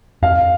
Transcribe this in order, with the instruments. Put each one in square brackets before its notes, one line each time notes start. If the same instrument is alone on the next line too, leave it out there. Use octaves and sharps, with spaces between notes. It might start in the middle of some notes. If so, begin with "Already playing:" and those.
[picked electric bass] F2 [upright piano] F5